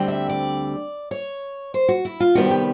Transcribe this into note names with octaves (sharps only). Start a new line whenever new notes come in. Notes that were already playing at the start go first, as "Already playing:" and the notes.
Already playing: D2 D3 G3 C4
E5
D5
C#5
C5
F#4
E4
F4
C3 D#3 G3 B3 F#4
G4